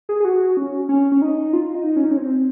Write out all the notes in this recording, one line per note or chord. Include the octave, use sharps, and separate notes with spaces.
G#4
G#4
F#4
C#4
C#4
C#4
D#4
F4
D#4
C#4
D#4
C#4
C4